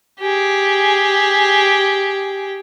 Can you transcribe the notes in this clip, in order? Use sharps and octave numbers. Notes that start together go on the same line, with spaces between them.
G4 G#4